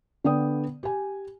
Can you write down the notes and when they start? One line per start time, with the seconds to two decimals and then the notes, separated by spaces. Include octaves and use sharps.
0.24 D3 B3 D5 G5 D#6
0.83 G4 G#5